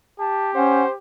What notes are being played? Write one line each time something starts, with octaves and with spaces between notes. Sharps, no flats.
G4 A5
C#4 C5 F#5